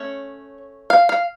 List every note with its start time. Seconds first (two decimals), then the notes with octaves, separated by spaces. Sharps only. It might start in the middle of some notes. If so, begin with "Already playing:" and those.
Already playing: A3 C#4 C#5
0.90 F5
1.09 F5